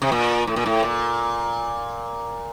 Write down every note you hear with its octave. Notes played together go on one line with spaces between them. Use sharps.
C3
A#2
A2
A#2
A2
A#2